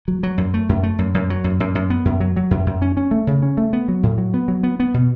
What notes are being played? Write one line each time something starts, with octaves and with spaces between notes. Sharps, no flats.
F#3
F#3
F#2
A3
F#2
A3
F#2
F#2
F#3
F#2
F#2
F#2
B3
F#2
F#3
F#3
F#2
F#2
C#4
C#4
A3
C#3
C#4
A3
B3
F#3
A2
F#3
B3
F#3
B3
B3
B2